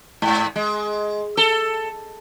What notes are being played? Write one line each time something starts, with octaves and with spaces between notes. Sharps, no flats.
G#2
G#3
A4